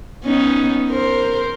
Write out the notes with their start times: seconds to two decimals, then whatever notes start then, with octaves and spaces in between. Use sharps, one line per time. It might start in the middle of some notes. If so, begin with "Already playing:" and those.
0.25 B3 C#4 D#4
0.89 A#4 C5